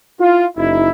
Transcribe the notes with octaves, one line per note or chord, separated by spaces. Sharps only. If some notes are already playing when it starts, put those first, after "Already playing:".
E4 F4
F#1 D#4 E4